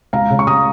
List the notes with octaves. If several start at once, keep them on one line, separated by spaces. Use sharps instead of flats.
C#2 F5 A#5
C#3
C#6
C#2 A#5 D#6